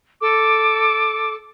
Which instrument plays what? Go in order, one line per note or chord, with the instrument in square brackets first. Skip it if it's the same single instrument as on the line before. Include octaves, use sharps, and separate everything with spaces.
[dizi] A4 [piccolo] D6